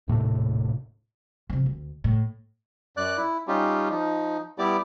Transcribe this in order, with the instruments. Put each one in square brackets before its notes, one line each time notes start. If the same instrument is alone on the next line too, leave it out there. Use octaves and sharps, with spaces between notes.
[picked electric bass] D#1 A2 C3 A3
[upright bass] C3 F3
D2
A2
[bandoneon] F#2 D5 F#6
E4
G3 C#4 D#4 F4 G4
F3 D#4
G3 B3 E4 G4 D5 D6